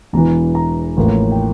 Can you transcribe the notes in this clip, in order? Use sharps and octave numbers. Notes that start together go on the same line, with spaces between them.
E1 E2 E3 A#5
A#5
A1 A2 F3 A#3
G5